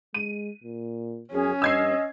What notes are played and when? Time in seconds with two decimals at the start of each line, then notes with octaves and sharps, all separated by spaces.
0.14 G#3 D#7
0.63 A#2
1.32 F#2 C#4 G#4
1.62 G2 D#5 E6 G#6 C7